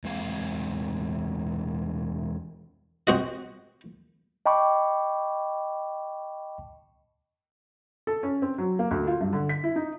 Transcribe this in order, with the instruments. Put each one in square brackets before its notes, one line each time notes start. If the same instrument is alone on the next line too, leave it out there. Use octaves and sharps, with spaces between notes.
[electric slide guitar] E2 G#3 C4 F5
[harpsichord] C4 F#4 D#5
[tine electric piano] D#5 G5 A5 B5 C#6 D6
[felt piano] A4
C#4
C4
F#3
A#3
D2
F4
G2
D3
B6
E4
D#4